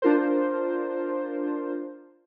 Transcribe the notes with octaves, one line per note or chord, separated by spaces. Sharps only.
D4 F4 A#4 C5